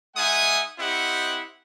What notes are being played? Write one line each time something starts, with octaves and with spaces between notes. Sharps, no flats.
G#3 D#4 E5 F#5 G#5 D#6
C4 E4 G4 D#5 F#5